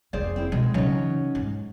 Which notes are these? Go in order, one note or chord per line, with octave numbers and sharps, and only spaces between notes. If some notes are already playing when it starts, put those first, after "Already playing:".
F1 D#3 G#4 C5 D5
C4 E4
B2 G#3
C#3 E3 F#3 C#4 D#4
G#2